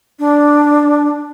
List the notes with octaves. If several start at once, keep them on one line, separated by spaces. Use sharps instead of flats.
D4